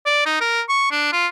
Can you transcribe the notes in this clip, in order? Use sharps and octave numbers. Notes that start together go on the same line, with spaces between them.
D5
D#4
A#4
C#6
D4
F4